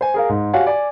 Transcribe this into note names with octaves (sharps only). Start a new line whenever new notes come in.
C5 G#5
G#4 A#4 F5
G#2
F#4 G4 C#5 F5 F#5 G#5
D5 G#5 D6